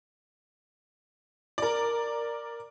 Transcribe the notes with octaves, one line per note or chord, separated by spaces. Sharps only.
A#4 D5